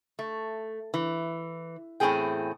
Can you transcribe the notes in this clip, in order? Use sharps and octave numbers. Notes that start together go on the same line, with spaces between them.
A3
E3
E2 A2 B3 C4 G#4 G5